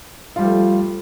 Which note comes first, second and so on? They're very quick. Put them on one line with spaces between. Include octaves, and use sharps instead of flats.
F4 G3 F3 A3